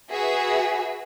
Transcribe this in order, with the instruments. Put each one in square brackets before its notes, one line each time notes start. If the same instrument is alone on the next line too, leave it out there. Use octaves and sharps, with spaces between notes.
[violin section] F#4 G#4 B4 E5